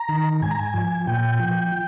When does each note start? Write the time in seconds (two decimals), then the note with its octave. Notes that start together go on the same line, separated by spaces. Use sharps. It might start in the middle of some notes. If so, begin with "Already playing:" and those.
Already playing: A#5
0.09 D#3
0.42 G#2 G#5
0.51 A#5
0.59 G#5
0.74 F3
1.07 A#2 G5
1.40 F3